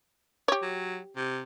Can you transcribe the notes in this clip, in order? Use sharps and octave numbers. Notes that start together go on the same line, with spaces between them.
G4 C#5
F#3
C3